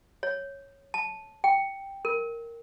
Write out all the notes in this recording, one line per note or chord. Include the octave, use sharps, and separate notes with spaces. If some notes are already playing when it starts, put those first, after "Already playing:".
C#5
A5
G5
A#4